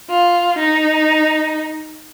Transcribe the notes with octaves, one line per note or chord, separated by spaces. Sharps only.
F4
D#4